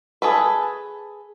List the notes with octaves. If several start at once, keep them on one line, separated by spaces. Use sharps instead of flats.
G#4 A4 B4